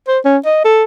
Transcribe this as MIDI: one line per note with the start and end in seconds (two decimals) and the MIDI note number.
0.07 0.19 72
0.25 0.37 61
0.45 0.64 75
0.65 0.84 69